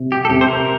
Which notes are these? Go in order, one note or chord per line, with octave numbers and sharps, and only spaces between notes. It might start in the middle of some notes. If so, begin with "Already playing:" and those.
Already playing: C3
G4
A4
C3 G4
C5
A#4